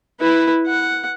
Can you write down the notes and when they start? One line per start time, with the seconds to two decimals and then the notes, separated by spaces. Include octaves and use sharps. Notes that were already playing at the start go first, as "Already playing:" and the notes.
0.20 E4 B4
0.66 F#5